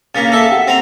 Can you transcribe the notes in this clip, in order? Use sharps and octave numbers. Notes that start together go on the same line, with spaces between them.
C#3 A#3 A6 B6
A4 E5 A5
G4 F#5 G5
C4 A#5